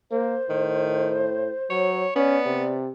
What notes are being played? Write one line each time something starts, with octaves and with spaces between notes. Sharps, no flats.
A#3 C5
A2 D#3
F#3 C#5
B3 C#4 D5
C3